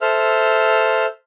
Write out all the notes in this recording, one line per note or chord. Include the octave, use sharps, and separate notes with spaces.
A4 C5 E5 F6